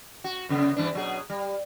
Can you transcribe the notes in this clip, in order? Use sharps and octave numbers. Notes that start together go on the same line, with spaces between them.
F#4
F#2 C#3 B3
G2 E3 D4
B2 F#3 G#4
G3